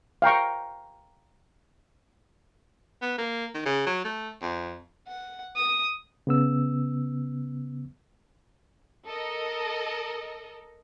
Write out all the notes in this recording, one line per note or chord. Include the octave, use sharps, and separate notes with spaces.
F5 G5 A#5 C#6
B3
A#3
D#3
C#3
F#3
A3
F2
F#5
D#6
C#3 B3 E6
A4 A#4 D#5